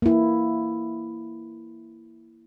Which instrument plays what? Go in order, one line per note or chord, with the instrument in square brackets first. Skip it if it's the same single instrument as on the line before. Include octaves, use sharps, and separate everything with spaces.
[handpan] A#3 E4